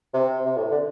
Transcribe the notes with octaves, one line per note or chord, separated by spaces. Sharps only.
C3
C3
A2
D3